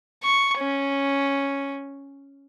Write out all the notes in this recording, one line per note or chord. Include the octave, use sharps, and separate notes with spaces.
C#6
C#4